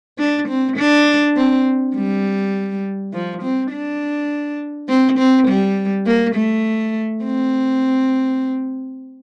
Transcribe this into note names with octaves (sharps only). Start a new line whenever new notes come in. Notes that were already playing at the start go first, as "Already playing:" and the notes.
D4
C4
D4
C4
G3
F3
C4
D4
C4
C4
G3
A#3
A3
C4